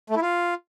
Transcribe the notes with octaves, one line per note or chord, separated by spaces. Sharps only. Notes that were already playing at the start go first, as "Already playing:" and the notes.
A3
E4
F4